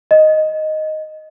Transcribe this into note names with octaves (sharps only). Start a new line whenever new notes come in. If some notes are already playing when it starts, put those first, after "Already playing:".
D#5